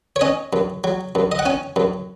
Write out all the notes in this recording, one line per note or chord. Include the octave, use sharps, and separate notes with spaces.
C#5
C#4 D#5
F#2
F#3
F#2
D#5
F#5
C#4 G#5
F#2